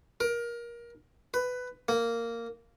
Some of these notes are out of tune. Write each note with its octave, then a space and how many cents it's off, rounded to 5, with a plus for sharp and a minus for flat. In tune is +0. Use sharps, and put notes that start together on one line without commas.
A#4 +20
B4 +15
A#3 -10